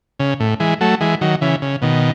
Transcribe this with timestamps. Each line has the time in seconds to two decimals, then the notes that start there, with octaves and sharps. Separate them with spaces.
0.20 C#3
0.40 A2
0.60 E3 G#3
0.81 F#3 A3
1.01 E3 G#3
1.21 D#3 F#3
1.41 C#3 E3
1.62 C#3
1.82 B2 D#3